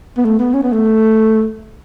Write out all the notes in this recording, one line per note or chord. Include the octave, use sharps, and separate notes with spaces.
B3
A3
B3
C#4
B3
A3